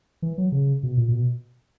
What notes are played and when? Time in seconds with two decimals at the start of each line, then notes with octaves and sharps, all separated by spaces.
0.22 E3
0.38 F#3
0.52 C#3
0.83 B2
0.97 A#2
1.08 A#2
1.12 B2